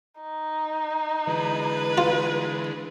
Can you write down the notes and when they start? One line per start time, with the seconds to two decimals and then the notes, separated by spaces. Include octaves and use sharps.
0.21 D#4
1.27 D3 E3 G#3 B4
1.98 F4